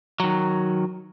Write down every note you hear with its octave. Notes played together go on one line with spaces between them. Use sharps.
D#3 F#3